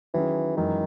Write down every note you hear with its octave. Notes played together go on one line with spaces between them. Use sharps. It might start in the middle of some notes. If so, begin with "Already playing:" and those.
D#3 E3 F#3 C#4 G#4
F#2 D#3 E3 G#3